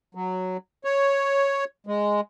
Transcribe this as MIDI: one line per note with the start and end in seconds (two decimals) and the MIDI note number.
0.15 0.57 54
0.84 1.64 73
1.87 2.21 56